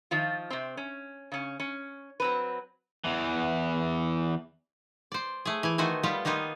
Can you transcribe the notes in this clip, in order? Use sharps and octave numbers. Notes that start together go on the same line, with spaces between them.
D#3 F3 F4
C3 C4
C#4
C#3 C#4
C#4
F#3 C4 B4
E2 E3
C5 D5
A3 G#4
E3 G#5
D#3 A3 F#4 C5 G#5
G3 B3 F4 G4
D#3 A#3 B3 D#4 F4